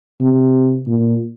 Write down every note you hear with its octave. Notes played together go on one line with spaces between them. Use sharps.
C3
A#2